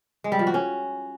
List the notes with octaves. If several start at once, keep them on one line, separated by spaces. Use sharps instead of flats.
G#3
G3
F3
F#4
C#4